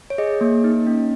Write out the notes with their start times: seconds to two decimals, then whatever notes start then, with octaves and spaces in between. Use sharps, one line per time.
0.10 C#5
0.18 G#4 D#5
0.41 A#3
0.64 D#4
0.87 C#4